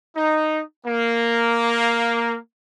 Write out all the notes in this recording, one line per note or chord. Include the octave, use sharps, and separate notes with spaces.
D#4
A#3